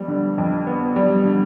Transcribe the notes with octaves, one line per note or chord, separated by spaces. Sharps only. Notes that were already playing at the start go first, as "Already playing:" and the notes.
Already playing: F2 G3 B3
D3
F2
B3
G3
D3